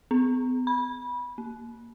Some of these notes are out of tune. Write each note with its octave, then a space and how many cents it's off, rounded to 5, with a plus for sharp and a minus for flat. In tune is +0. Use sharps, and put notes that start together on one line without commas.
B3 +40
B5 -20
A#3 +0